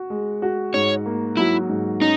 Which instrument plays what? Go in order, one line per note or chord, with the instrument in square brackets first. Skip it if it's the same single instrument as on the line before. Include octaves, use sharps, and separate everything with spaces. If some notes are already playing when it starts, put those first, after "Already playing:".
Already playing: [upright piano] F#4
G#3
F#4
[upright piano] G#2 [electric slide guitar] C#5
[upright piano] A#3
[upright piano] F#3 [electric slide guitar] E4
[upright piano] G#2
[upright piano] C#4 [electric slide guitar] D#4